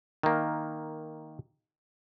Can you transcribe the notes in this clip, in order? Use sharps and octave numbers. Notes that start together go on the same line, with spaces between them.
D#3 A#3